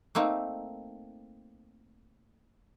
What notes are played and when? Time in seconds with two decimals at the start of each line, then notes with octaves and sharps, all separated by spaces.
0.15 A3 A#3 C4 D#4